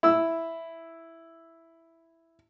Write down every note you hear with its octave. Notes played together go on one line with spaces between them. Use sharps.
E4 E6